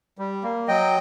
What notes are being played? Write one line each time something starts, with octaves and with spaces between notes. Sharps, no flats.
G3
A#3
F#3 D#5 G5